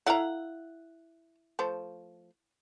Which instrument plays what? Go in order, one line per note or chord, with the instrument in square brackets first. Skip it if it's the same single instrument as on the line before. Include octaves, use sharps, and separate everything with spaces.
[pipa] E4 F5 F#5 [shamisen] A4 A#5
[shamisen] F3 A3 C5